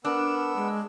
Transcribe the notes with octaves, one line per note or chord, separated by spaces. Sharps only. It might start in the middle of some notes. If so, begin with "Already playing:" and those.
B3 D4 A#4 E6
G#3